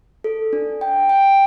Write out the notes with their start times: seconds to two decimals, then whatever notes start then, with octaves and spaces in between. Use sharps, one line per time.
0.24 A4
0.53 D4
0.81 G5
1.10 G5